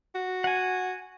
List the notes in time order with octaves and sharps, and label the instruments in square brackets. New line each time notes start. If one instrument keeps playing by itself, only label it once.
[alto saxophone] F#4
[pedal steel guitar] F#5 G#5